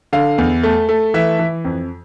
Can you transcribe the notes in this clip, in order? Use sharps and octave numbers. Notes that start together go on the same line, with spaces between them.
D3 F5
E2
A3
A3
E3 E5
E3
F2